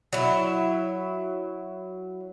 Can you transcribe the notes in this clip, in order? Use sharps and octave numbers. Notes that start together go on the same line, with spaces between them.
F#3 E4